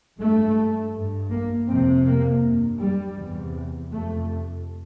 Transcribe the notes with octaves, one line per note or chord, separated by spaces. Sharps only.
G2 A3
G2
A#3
F2 C3 C4
A#3
G2
G3
E2 C3
F2 C3 A3